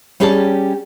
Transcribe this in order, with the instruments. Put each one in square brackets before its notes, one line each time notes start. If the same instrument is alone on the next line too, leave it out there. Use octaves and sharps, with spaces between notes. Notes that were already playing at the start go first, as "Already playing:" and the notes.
[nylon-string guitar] G3 C#4 G4 G#4 D5 A5